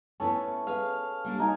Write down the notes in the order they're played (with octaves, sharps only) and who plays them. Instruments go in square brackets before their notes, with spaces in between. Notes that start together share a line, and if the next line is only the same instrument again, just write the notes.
[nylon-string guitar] A3 B3 E4 [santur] C#4 A4
[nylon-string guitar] G#4 B4 C#5 [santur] F5
[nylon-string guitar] G3 A#3 D4
[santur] D#4 G#5 [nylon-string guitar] F#4